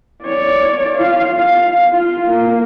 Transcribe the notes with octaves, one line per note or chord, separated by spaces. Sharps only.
C#5 D5
F4 F5
F5
F4
A#3